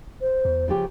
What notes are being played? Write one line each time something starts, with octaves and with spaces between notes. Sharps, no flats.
C5
E2
C#3 F3 G4